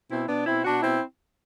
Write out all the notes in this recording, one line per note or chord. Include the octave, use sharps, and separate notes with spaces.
B2 C4 E4
B2 B3 D4
B2 C4 E4
B2 D4 F#4
B2 C4 E4